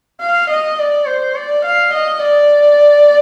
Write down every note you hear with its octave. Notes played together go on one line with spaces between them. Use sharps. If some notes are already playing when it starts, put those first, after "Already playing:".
F5
D#5
D5
C5
D5
F5
D#5
D5